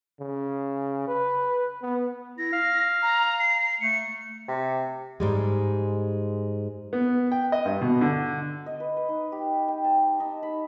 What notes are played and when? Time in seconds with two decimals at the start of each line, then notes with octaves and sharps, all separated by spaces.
0.20 C#3
1.08 B4
1.82 B3
2.38 E4 A#6
2.53 F5
3.02 A#5
3.39 C7
3.81 A3 C#7
4.48 C3
5.20 G#2 G3 G#3
6.93 B3
7.32 G5
7.52 D#5
7.65 G2
7.81 B2
8.01 D3
8.66 D#5
8.80 B4
8.97 B4
9.09 D#4
9.32 G4
9.68 G5
9.84 A5
10.20 D#4
10.43 B5